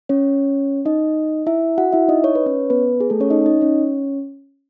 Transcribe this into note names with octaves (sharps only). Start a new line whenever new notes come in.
C#4 C#5
D#4 D#5
E4 E5
F#4 F#5
E4 E5
D#4 D#5
C#5
B4
C#4 C#5
B3 B4
G#4
A3 A4
C#4 C#5
D#4 D#5
D#4 D#5
C#4 C#5